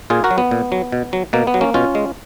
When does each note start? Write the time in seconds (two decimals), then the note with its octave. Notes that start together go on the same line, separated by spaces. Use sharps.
0.10 A#2 F4 G#4
0.24 F#4 A#4
0.31 F#3
0.38 B3
0.51 A#2
0.72 F#3
0.92 B2
1.13 F#3
1.33 B2 A#3
1.47 B3
1.54 F#3
1.61 A#3 C#4
1.74 B2 C#4 F4
1.95 G#3